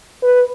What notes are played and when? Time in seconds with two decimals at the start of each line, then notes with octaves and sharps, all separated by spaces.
0.23 B4